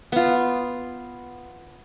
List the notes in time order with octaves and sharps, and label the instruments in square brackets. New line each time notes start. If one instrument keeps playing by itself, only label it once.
[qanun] B3 F4